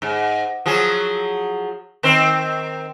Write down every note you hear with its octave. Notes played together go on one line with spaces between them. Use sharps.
G#2
F3 F#3 G#4
D#3 C4 C5